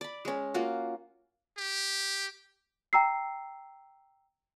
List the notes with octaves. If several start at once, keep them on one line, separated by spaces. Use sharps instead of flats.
D5 B5
G#3 C#4
A#3 F4 F#4
G4
G5 A#5 E6 C7